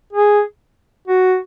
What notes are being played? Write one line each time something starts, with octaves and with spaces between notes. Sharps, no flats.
G#4
F#4